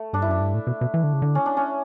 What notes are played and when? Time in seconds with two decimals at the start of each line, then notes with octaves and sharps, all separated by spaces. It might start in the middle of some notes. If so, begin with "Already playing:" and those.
Already playing: A3
0.13 G2 D4
0.22 E4
0.28 F#2 D4
0.40 G2
0.54 A2
0.67 B2
0.81 B2
0.94 E3
1.04 D3
1.13 C#3
1.22 D3
1.35 C#4
1.46 D4
1.57 C#4